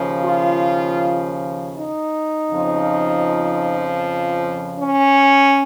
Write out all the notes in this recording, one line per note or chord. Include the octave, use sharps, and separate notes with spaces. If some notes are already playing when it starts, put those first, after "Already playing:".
Already playing: D#2 C#3 F3
F4
D#4
F2 C#3 F3
C#4